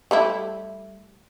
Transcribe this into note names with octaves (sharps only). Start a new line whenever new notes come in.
G3 A3 E4